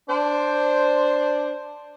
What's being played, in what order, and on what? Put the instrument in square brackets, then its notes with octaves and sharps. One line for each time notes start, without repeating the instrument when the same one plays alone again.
[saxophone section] D4 C5